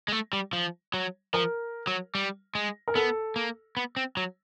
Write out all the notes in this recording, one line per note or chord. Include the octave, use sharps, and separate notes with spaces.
G#3
A3
G3
F3
F#3
F3 A#4
F#3
G3
G#3
A#4
B3 A4
A#3
B3
C4
F#3